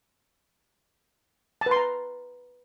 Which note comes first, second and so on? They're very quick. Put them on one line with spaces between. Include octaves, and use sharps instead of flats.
A5 B4 C6 A#5